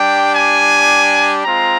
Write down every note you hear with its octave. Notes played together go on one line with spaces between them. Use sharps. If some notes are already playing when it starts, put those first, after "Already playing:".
Already playing: G3 D4 G4 G5
G#5
G#3 C4 F4 A#5